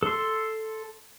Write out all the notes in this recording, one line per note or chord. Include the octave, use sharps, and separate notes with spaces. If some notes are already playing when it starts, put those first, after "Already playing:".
A4 C6